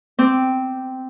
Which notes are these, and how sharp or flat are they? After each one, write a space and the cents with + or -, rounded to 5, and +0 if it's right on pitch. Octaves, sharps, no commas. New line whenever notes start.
C4 -10 D6 +0